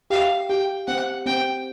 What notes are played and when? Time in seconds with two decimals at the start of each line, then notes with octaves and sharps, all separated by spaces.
0.10 G4 F5
0.50 G4 G5
0.88 C4 F#5
1.26 C4 G5